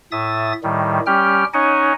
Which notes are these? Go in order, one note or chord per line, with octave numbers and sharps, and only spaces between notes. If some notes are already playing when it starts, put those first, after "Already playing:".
A2 E5 D#6 A6
A2 D#3 G3
G3 C#4 G4 G5 F6
C#4 D#4 C#5 D#5 F#5 G#5